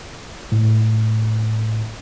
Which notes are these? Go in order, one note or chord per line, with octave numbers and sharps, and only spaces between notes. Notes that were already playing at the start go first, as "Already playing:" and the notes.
A2